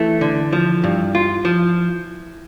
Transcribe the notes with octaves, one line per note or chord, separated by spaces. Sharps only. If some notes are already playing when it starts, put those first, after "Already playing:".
Already playing: E3 A3
D3
F3
G2
F4
F3